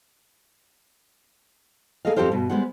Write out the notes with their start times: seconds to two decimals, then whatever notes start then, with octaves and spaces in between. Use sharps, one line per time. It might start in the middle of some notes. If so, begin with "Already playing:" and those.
2.05 A#3 G#4 A4 D#5 F5
2.16 F2 F4 G4 A4 C5 F5
2.32 G2 B2
2.49 G3 G#3 B3 G#4 C5 F#5